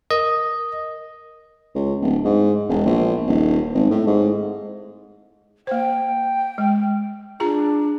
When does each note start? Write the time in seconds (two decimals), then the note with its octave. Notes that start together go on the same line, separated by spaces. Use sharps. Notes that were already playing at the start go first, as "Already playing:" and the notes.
0.11 A#4 D#5
1.75 C#2
2.02 D1
2.25 G#2
2.69 E1
2.85 A#1
3.27 D#1
3.74 G#1
3.90 A2
4.07 G#2
5.67 A#3 C5 G5
6.58 G#3
7.40 D4 F4 G#4 A#5